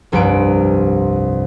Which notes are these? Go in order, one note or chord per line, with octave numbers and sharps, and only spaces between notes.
F1 C2 G2 B4 D7